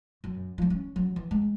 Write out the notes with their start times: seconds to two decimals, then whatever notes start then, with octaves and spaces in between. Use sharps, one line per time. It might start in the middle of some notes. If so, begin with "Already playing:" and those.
0.24 F#2
0.58 F3 G3
0.70 C#4
0.96 F#3
1.16 E3
1.31 G#3